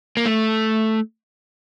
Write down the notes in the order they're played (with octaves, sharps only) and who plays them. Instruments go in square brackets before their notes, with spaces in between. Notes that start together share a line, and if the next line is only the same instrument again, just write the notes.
[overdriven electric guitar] A#3
A3